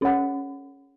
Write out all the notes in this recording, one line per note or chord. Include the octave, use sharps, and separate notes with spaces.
C#4 G#4 C#5 F#5 B5